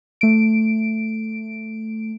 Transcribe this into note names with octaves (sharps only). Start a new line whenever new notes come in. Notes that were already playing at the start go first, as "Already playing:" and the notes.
A3 D7